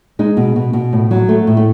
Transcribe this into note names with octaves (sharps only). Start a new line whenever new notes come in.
G#3 D#4
B2
B2
B2
A2
F#3
A3
A2
A3